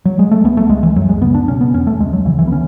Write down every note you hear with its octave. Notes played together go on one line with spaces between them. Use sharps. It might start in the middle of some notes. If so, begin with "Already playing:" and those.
F#3
G#3
A3
C#2 B3
A3
C#2 G#3
E3
F#2 F#3
G#3
C#3 B3
D4
B2 C#4
B3
E2 C#4
A3
C#2 G#3
F#3
C#3 E3
E3
B3
D3 C#4